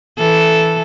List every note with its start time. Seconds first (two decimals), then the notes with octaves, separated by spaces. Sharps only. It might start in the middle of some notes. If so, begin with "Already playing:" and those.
0.18 E3 A4